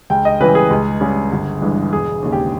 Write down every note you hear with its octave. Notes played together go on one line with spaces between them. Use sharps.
C#2 G5
D#5
C#3 E3 G3 B4
G#4
C#2
C#3 G3
G1
G2 E3 G#3
E1 G#4
D#2 C#3
G4